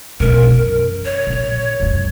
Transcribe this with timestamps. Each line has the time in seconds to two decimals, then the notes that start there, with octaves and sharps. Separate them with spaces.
0.20 B2 A#4
0.46 F#2 E3
1.05 C#5
1.27 A#2
1.80 C#2 F#2